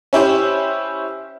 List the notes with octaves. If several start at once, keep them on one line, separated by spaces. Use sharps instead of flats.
C#4 E4 G4 C5